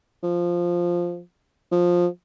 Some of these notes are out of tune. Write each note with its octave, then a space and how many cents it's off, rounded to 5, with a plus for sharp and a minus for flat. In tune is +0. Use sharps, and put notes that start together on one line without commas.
F3 +0
F3 +10